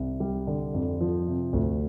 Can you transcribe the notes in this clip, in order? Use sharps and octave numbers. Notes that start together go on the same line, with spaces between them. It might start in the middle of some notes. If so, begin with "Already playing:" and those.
Already playing: C2 C3
G3
D3
F2
F3
C3
D2